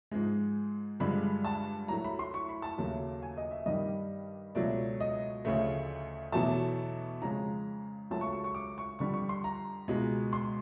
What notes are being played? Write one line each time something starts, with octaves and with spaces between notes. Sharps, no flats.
G#2 F3 G#3
G2 D3 F3 G#3 B5
A5
A2 F#3 A3 A#5
B5
C6
C#6
B5
A5
D#2 C#3 F#3 A3
G#5
D#5
E5
G2 D#3 G3 D#5
C#2 B2 F#3 A3 D5
D#5
D2 C#3 F3 A3
E2 B2 F#3 A3 A5
F2 C#3 F3 G#3 A#5
C#2 C#3 F#3 A3 A5
C#6
C#6
C#6
D6
C#6
F2 D3 G3 C#6
C#6
C6
A#5
C#2 B2 G#3
C6